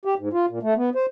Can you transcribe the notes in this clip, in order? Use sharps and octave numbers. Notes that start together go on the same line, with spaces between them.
G4
G#2
F4
A#2
A3
B3
C5